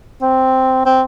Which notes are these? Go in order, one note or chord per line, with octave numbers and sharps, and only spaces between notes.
C4
C4